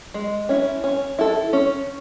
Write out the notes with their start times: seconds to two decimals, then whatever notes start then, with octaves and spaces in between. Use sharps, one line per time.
0.14 G#3
0.49 C#4 E4
0.84 C#4
1.19 E4 A4
1.53 C#4